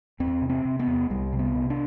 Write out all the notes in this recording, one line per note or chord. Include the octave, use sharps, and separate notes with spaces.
E2 C4
C3
C4
C3
B3
E2
C2 G3
C3
B3
C3
D4